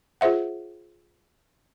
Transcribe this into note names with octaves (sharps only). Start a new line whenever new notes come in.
F4 G#4 C5 E5 F#5